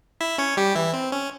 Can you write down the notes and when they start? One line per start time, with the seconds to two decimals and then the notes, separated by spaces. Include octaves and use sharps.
0.21 E4 E5
0.38 C#4 C#5
0.57 G3 G4
0.75 E3 E4
0.93 C4
1.12 C#4